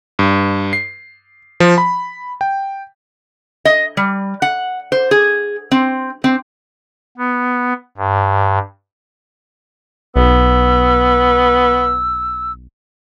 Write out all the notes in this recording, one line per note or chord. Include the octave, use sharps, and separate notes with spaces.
G2
C7
F3
B5
G5
D#5
G3
F#5
C5
G#4
C4
C4
B3
G2
B1 B3 E6